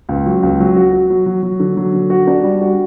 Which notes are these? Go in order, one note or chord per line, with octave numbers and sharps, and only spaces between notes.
C#2
F#3
C#2
F#3
F#4
F#4
F#3
F#3
F#3
D3
F#3
D3
F#4
D4
G3
F#4